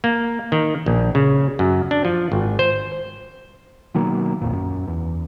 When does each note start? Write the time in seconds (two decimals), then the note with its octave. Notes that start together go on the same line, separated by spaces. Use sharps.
0.04 A#3
0.52 D#3
0.86 A#1
1.15 C#3
1.59 F#2
1.91 D4
2.05 F3
2.32 G#1
2.59 C5
3.94 B2 D#3 F#3 A#3
4.41 B1 F2 A#2
4.53 F#2
4.88 E2